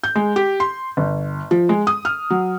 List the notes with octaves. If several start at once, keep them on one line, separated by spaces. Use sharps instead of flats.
G6
G#3
G4
C6
G1
F3
G#3
D#6
F6
F#3